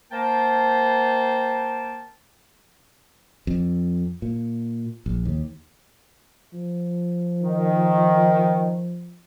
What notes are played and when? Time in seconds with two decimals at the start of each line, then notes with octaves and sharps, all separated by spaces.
0.12 A#3 A#4 C5 G5 A5
3.47 F2
4.22 A#2
5.06 A#1
5.26 D#2
6.54 F3
7.43 D#3